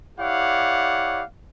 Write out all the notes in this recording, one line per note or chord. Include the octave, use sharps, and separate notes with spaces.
E4 G4 C#5 D5 F5 F#5